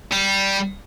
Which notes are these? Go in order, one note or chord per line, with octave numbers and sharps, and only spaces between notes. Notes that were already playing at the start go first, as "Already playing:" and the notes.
G3